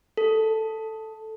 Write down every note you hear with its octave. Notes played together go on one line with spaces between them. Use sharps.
A4